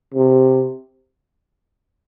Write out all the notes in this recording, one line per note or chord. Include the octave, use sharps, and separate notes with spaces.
C3